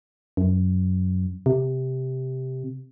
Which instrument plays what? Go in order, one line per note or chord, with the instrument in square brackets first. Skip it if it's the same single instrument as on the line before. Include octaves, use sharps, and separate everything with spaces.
[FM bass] F#2
C3